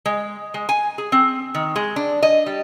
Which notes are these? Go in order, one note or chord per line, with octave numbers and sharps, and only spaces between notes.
G#3
G#3
G#5
G#4
C4
D#3
G#3
D4
D#5
G3